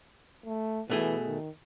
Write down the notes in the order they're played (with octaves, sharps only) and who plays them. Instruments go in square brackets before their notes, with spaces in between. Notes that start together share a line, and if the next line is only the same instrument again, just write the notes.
[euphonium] A3
[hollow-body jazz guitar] B2 A3 G#4 [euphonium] E3
[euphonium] D#3